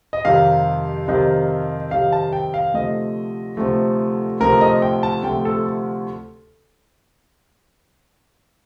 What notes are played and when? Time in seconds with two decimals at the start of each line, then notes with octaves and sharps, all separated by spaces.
0.13 D#5
0.25 F2 C3 D#3 G3 F5
1.08 F2 C3 D#3 G3
1.91 F2 C3 D#3 G3 F5
2.12 A5
2.33 G5
2.54 F5
2.74 D2 C3 F3 A3 D#5
3.57 D2 C3 F3 A3
4.40 D2 C3 F3 A3 A#4
4.61 D#5
4.82 G5
5.03 A5
5.23 D2 C3 F3 A3 G5
5.45 A4